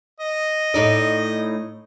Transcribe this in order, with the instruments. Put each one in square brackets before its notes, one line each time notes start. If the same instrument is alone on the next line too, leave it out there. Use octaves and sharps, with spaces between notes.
[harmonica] D#5
[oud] A2 D#4 D5